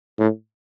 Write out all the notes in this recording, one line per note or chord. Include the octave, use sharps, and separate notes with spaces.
A2